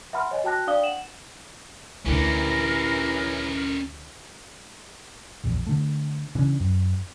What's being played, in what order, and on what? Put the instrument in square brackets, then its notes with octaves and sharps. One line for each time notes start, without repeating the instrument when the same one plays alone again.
[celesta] E5 F#5 A5 B5 C6 F6
C#5 D#5 G#5
F#4 G5 A5 F#6 A#6
D4 D5 F5 G5 D#6 G7
F#5 E7 F#7
[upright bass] D2 D3 [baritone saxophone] E3 [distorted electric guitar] C#4 G4 [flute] A#4
[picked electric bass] A#1 E2
D3 A3
C#3 E3 C#4 D4
F#2